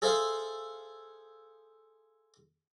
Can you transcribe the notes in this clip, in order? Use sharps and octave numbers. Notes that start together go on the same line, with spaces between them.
G#4 A4 C5 E5 F5